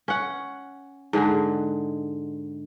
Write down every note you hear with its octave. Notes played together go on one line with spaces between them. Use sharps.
C#4 F#5
G#2 D3 G#3